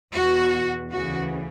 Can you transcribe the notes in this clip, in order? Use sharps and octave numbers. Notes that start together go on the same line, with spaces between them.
E2 B2 F#4
D2 C#3 E3 F#4